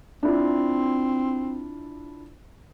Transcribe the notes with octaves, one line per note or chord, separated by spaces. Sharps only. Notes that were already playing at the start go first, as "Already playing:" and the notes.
C4 D4 E4 F4